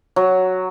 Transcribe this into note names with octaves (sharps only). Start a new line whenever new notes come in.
F#3